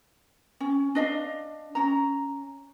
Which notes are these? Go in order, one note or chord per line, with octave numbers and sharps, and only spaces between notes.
C#4
D4 D#5 F5
C#4 A#5